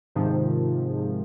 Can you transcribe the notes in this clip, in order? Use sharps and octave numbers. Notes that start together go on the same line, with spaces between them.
G#2 C3 D#3 F3